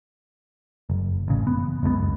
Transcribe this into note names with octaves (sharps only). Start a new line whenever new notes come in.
F#1
A1 C#3
B3
F#1 C#2 C3 B3